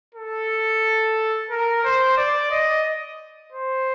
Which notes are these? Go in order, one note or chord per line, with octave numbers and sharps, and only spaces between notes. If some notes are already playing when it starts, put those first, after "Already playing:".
A4
A#4
C5
D5
D#5
C5